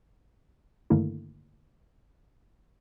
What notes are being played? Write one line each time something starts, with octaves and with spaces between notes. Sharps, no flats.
G2 D3 D#3 A3 A#3 E4